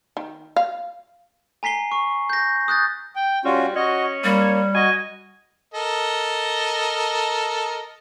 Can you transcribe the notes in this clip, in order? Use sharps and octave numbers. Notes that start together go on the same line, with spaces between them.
D#3
F5
G#5 A#5 B6 C7 G7
C#6
G6 A#6
D#6 F#6 G6 A6
G5
G3 C#4 F4 F#4
C#4 F#4 D#5
G3 A#3
F#4 D#5 G#5
A4 A#4 D#5